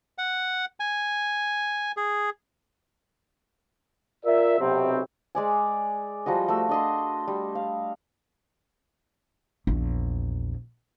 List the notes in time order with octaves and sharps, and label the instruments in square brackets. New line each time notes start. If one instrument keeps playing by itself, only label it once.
[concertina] F#5
G#5
G#4
[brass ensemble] F4 A#4 D5 E5
B1 C3 C4
[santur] G#3 D5 G#5
F3 G3 F#4 D#5
A3 E6
D4 D#5 C6
G3
F5
[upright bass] A#1 E2